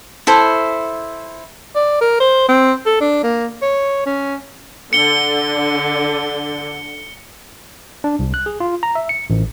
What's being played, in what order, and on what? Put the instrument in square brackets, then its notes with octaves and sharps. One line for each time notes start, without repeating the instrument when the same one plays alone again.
[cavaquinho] E4 A4 C5
[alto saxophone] D5
A#4
C5
C4
A4
D4
A#3
C#5
C#4
[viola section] D3 [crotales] C#7 G7
[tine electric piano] D4
C2
F#6
G#4
F4
A#5
E5
C#7
A1